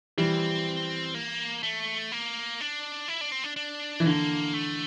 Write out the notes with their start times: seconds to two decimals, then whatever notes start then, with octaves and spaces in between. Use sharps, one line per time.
0.18 E3 G3 C4
1.15 A#3
1.63 A3
2.12 A#3
2.61 D4
3.08 E4
3.21 D4
3.32 C4
3.44 D4
3.56 D4
4.00 E3
4.06 D3 A#3
4.54 A3